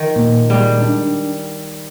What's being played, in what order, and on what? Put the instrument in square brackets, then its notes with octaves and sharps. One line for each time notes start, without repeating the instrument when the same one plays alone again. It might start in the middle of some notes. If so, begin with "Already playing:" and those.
Already playing: [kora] D#3 [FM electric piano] F3
[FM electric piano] A#2
[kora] G3 [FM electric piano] G#3
[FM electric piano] D4